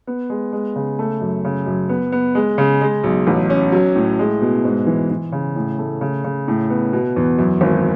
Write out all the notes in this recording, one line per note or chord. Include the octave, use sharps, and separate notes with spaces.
B3
G#3
G#3
C#3
A3
F#2
C#3
F#2
B3
B3
G#3
C#3
G#3
B1
A1
C#4
F#3
A2
G#3
B2
G#2
E3
E3
C#3
A2
A3
C#3
C#3
A2
B3
B2
E2
F#2
G#1